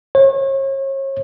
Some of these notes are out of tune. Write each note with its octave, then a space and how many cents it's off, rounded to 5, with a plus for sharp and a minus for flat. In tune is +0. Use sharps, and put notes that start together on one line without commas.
C#5 -35